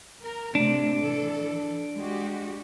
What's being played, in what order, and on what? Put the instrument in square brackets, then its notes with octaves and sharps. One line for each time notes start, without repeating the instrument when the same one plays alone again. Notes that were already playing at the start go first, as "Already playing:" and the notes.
[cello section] A#4
[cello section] A2 C3 A3 [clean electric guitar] D4
[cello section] E3 A4
G#3 F#4 G4